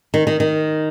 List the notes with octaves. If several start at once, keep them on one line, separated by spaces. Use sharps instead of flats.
D#3
D#3
D#3